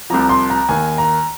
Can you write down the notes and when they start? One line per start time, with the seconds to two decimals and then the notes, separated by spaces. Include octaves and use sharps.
0.10 C2 C3 F3 A#5
0.29 C6
0.50 A#5
0.69 D#2 D#3 G#5
0.98 A#5